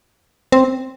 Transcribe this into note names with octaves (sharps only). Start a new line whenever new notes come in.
C4